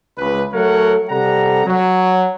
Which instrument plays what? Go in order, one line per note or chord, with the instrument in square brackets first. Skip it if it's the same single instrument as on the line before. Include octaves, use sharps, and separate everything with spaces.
[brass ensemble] C#2 B4
F#3 A3 A4 A#4 C#5 F#5
C3 G3 A4 F#5 A#5
F#3